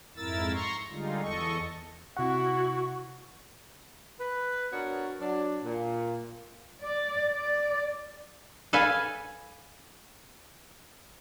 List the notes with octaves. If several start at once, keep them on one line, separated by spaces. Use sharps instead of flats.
F2 G#2 E4 A#4 E6 A6
A#5 C6 C#6
D3 G3 G#3 D#4 F4
E2 A4 D#5 C#6
C3 E4 F#4 F#5 C#6
B4
B3 D4 F#4 A#4 C#5
F#3 D4
A#2
D5
D5
A4 B4 F5 G#5